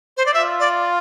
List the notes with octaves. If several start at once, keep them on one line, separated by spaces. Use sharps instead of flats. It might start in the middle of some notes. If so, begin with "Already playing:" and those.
C5
D5
F4 E5
D5